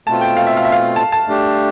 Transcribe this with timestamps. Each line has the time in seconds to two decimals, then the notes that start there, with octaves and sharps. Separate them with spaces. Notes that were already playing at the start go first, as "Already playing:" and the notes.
0.07 B2 A3 C4 F4 A5
0.21 G5
0.37 F5
0.47 E5
0.57 F5
0.65 E5
0.72 F5
0.96 A5
1.12 A5
1.27 A3 D4 G4